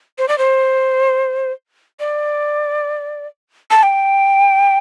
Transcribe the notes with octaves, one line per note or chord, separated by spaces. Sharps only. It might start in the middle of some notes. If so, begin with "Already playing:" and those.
C5
D5
C5
D5
A5
G5